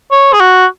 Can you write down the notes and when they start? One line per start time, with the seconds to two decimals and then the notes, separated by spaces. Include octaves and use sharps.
0.12 C#5
0.33 G#4
0.40 F#4